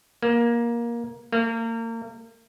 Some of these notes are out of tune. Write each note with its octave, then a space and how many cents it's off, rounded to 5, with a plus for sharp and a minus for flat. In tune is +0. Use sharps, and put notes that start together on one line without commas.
A#3 +15
A#3 -35